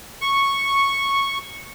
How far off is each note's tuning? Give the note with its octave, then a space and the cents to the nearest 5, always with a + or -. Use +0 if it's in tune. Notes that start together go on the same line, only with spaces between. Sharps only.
C#6 -5